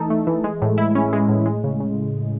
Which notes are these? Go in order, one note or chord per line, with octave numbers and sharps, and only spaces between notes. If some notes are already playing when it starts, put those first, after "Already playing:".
Already playing: E3 A3 D#4 A4
A3
E3
G#3
A2
E4
C#4
G#3
A2
G#3
C#3
C#3